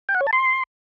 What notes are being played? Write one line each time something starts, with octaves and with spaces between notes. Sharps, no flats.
G5
F#5
C#5
A5
C6